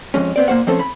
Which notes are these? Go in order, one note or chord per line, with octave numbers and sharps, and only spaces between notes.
F2 G#3 C#4
B3 C4 D5
A#2 A#3 C5 F#5
F3 A3 C4 C#4 A4 C5
B5